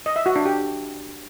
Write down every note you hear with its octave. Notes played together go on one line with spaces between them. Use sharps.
D#5
E5
F#4
D4
G4